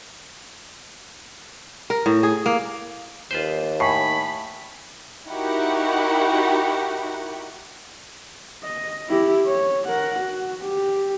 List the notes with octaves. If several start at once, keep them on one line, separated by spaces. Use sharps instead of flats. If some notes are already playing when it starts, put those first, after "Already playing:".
A#4
A2
G#4
A#3
D#2 F4 B4 C5
A2 G#5 B5 C#6 C7
D#4 E4 F#4 G4 A#4 F#5
D#5
E4 G4
C#5
A#4 F#5
F#4
G4